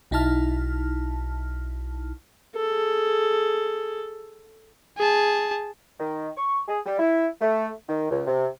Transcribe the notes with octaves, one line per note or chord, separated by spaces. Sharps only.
B1 D#4 E4 A5 F6
G#4 A4
G#4 A5
D#3
C#6
G#4
G3
E4
A3
D#3
C#2
C3